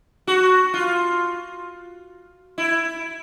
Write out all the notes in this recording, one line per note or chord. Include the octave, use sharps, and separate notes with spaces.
F#4
F4
E4